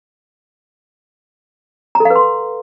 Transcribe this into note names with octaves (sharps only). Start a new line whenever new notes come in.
A#5
A4
F5
B4
C6